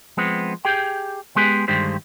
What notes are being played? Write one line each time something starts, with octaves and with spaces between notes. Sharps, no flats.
F3 G#3 B3 C4
G4 G#4 G5
G#3 B3 G4 G#4
G2 D3 D#3 G#3 G4 C5